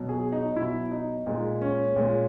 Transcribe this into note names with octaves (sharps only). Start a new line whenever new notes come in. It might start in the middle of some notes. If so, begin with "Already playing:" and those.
Already playing: B2 F#3
G#4
D#4
B2 F#3 E4
D#4
A#2 G#3 D#4
C#4
A#2 G#3